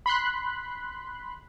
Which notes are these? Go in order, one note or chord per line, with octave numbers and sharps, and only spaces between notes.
B5 C6 F#6